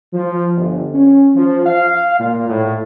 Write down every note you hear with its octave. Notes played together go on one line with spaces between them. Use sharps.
F3
G1
C#4
F3
F5
A#2
A2